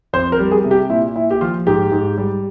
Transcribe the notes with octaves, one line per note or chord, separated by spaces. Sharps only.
F2 C5
A#4
G3
G#4
C3
G4
A#2 E4
A#2 E4
G4
F3 F4
G#2 G4
G#2
G3